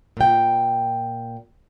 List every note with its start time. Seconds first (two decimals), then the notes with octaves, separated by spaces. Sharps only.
0.17 A#2 G5